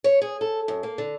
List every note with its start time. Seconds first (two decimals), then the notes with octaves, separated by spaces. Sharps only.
0.04 C#5
0.22 G#4
0.41 A4
0.68 F#2
0.83 A#3
0.98 D3